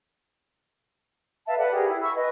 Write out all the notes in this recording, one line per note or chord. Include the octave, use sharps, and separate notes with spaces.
B4 E5 F5 A5
A4 B4 D5 F#5
G4 G#4 A#4
E4
B5 C#6 E6
B4 D#5